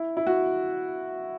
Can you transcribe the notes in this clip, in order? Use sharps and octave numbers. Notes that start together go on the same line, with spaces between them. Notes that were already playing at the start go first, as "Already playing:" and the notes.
Already playing: E4
E4
F#4